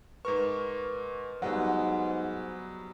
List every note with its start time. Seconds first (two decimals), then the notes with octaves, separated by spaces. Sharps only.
0.25 G#2 A#4 B4 C#6
1.42 G#2 F#3 G3 B3 F#5